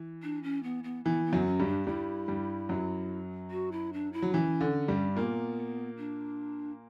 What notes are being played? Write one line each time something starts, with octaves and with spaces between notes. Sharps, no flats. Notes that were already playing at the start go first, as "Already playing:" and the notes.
Already playing: E3
D4
C#4
B3
B3
E3 B3
B3
F#2 F#3
C#4
G2 G3
D4
G2 G3 E4
G2 G3
F#2 F#3
F#4
E4
D4
E4
F#3
E3 C#4
D3
G2 G3
A#2 A#3 B3
D4